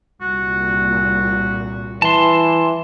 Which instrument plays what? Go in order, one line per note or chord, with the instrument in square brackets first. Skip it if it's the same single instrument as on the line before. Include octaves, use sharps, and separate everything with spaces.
[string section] C2 A#2 [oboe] F#4
[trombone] E3 [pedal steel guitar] A5 C6